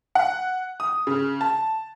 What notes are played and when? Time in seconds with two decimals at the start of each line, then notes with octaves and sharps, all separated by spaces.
0.15 F#5
0.80 D#6
1.07 C#3
1.41 A5